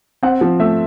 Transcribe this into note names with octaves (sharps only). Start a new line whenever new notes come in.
C4 F#5
F3
A3 E5